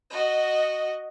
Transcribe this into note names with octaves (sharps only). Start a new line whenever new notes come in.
F#4 D#5